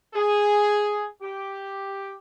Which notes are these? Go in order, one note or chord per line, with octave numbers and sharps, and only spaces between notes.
G#4
G4